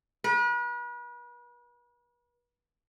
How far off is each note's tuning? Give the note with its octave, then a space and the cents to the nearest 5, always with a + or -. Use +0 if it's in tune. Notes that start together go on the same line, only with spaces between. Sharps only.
B4 -40